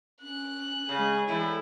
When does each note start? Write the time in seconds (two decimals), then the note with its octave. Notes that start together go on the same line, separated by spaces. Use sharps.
0.22 C#4 F#6
0.89 C#3 G#3 G#4
1.28 E2 A2 E4